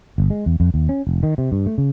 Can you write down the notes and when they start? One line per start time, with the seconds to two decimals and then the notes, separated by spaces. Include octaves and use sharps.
0.18 G1
0.30 G#3
0.46 E2
0.60 F2
0.74 D#2
0.89 C#4
1.07 F1
1.23 D#3
1.38 C3
1.52 G2
1.66 A3
1.78 C#3